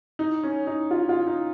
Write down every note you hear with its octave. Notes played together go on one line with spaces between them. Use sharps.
D#4
C#4
D#4
F4
F4
D#4